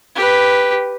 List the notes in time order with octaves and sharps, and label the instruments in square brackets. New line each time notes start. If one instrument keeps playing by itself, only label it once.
[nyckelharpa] G4 B4